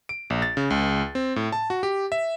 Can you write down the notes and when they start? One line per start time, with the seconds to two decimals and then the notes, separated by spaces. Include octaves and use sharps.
0.09 D7
0.30 A#1
0.42 A6
0.57 C#3
0.70 C#2
1.15 C4
1.36 A2
1.52 A5
1.70 F#4
1.83 G4
2.12 E5